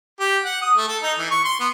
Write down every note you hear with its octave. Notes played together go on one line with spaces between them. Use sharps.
G4
F#5
D#6
A3
A4
D#4
E3
C#6
C6
B3